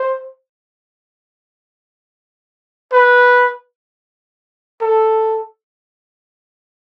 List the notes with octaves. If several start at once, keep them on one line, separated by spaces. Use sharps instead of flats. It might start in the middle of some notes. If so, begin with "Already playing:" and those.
Already playing: C5
B4
A4